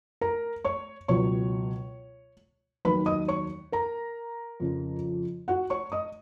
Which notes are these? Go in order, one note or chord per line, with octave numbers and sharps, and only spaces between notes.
A#4 A#5
C#5 C#6
C#2 B2 F#3 C#5 C#6
D#2 D#3 F#3 B4 B5
D#5 D#6
C#5 C#6
A#4 A#5
F2 C#3 F3
F#4 F#5
C#5 C#6
D#5 D#6